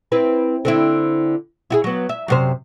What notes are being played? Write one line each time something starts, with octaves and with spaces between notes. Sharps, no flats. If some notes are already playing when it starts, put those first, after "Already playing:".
C4 E4 B4
D3 C4 E4
E4 F#4 G#4
F#3 B3
E5
F#2 C3 C5